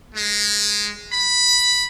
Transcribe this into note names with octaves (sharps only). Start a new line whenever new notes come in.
G#3
B5